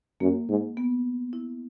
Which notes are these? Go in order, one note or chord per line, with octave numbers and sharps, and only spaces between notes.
F#2 A#3
G#2
B3
E4